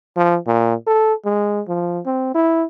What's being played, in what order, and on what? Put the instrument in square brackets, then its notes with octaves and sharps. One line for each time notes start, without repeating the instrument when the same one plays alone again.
[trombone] F3
A#2
A4
G#3
F3
C4
E4